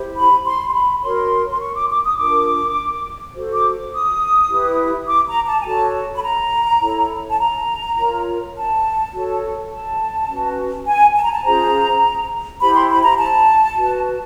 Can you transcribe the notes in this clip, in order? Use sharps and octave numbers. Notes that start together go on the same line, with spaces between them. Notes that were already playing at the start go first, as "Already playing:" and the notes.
Already playing: E4 G4 C5
B5
C6
C6
B5
F#4 A#4 C#5 C6
C6
C#6
D6
D6
D#6
D4 F4 A#4 D6
F#4 A4 C5
D6
D#6
E4 G4 B4
D6
A#5
A5
G#5
F#4 A4 C#5 A5
B5
A#5
E4 A4 C#5
A5
A#5
F4 A#4 C#5
A5
F#4 A4 C#5
A5
C#4 F#4 B4
G#5
A5
A#5
A5
C#4 F4 G#4 C5 A#5
E4 G4 C5 B5
C6
B5
A#5
A5
F#4 B4